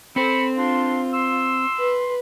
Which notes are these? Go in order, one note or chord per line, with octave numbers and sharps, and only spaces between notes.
C4 A4 C5 B5 C#7
D4 F4 C6
C6 E6
B4